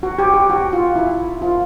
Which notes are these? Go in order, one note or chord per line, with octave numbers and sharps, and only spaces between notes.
F#4
G4
G4
F#4
F4
E4
F4